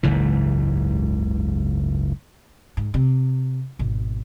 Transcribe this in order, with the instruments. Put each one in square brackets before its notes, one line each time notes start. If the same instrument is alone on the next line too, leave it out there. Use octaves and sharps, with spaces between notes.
[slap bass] F#1 C#2 G#2 E3
[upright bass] G#2
C3
G#1 B2